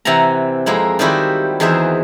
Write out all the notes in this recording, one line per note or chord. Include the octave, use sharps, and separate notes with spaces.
C3 E3 E5 F#5 A#5
F2 G#3 A#3 E4
D#3 G3 C4 E4 F#4 G4
E2 D#3 E3 G#4 C5 E5